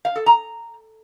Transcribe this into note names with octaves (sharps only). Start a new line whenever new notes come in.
F5
A4
A#5